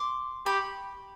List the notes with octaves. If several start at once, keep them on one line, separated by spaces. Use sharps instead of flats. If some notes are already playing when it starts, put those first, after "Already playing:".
Already playing: C6 D6
G4 B5 C#6